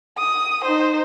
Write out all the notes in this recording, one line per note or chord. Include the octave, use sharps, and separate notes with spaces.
D#6
D#4 C5